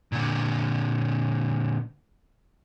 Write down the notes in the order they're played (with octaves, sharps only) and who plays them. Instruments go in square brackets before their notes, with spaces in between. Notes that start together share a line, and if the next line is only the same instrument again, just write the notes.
[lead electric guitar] A#2 D3